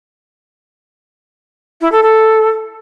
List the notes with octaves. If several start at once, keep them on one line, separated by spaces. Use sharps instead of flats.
E4
A4
A4